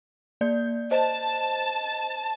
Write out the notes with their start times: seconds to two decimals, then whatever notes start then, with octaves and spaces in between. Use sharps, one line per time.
0.41 A#3 D5 G6
0.91 C5 D#5 A5